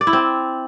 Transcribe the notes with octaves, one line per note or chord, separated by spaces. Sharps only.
D5
E4
C4